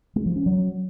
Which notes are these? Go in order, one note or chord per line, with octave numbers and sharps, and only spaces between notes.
G#3
F3
C#4
F#3